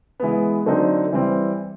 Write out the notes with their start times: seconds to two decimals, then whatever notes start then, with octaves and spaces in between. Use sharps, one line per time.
0.20 E3 G#3 B3
0.66 D3 F#3 A3 C4 D#4
1.12 E3 G3 C4